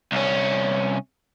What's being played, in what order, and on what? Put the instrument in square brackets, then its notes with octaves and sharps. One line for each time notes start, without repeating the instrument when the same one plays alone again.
[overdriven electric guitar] C2 C#4